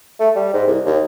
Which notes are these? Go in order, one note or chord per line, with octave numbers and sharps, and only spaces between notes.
A3
G3
G#2
C2
D#2